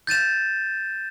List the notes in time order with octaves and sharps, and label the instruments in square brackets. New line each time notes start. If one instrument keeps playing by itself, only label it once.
[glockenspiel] G6 A6 D#7 E7